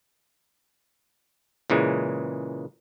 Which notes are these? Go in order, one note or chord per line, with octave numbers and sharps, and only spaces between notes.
A#2 C#3 E3 G#3